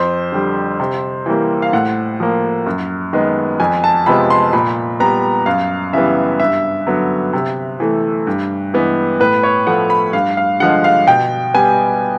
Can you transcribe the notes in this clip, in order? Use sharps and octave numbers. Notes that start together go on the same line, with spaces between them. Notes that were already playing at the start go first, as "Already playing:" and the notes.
Already playing: F2 C5
D3 G3
C3
E3 G3 A#3
F5
A2 F#5
F3 A#3
F#2
D#3 G#3 B3
F2 G#5
A5
C3 F3 G#3 B3 B5
C6
A#2 B5
G3 B3 A#5
F#2 F5
C#3 E3 G3 B3 E5
G2 E5
D3 F#3 B3
C3
E3 A3
G2
E3 G#3 B3
A2 B4
C#5
F3 A3 F#5
B5
G2 F5
F5
D3 F3 G#3 F#5
F5
B2 G5
G3 B3 G#5